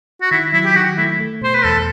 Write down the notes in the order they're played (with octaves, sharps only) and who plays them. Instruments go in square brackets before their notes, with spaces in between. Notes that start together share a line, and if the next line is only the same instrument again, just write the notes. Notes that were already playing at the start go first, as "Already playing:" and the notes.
[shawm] F#4
[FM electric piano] D#3 [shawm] E4
[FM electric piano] F#3 [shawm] E4
[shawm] G4
[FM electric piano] D#3 [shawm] F#4
[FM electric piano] A3 [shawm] E4
[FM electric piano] A3
[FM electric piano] B2 [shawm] C5
[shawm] B4
[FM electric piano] E2 [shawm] A4